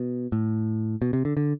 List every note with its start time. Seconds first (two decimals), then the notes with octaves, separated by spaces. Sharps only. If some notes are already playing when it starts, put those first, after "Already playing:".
Already playing: B2
0.32 A2
1.02 B2
1.13 C3
1.25 D3
1.37 D3